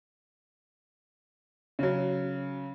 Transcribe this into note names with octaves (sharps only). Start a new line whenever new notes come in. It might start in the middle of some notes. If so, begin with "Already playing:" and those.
C#3 F#3